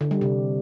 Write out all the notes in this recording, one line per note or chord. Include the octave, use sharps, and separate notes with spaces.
D3
G3
C3